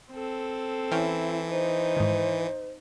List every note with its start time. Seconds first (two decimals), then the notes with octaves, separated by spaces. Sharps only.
0.11 C4 A4
0.91 E3 C#4 E4 G5 F6
1.50 D#4 C5
1.97 G#2 D#3